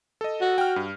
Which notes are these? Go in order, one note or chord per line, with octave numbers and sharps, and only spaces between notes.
A4 D#5
F#4
G5 F6
G2